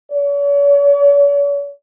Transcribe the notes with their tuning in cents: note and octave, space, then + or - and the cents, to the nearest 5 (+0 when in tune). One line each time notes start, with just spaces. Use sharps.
C#5 +45